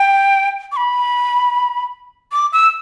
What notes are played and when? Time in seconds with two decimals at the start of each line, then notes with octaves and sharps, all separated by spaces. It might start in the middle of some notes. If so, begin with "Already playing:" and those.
Already playing: G5
0.72 D6
0.77 B5
2.32 D6
2.53 E6